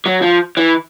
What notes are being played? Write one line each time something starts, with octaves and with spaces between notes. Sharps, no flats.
F#3
F3
E3